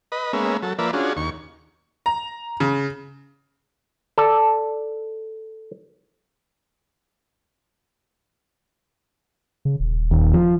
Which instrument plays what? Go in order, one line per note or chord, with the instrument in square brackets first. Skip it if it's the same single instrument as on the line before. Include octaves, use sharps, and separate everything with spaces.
[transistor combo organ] B4 D#5
G#3 A#3 B3 C#4 E5
F#3 A4
F3 A#3 B4 D5 E5
C#4 D4 F4 F#4 G#4
D#2 C#6
[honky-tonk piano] A#5
C#3
[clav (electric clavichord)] A4 D5
[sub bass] C#3
D#1
[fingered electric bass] D#2
F3